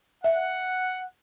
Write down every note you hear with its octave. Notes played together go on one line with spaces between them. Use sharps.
E5 F#5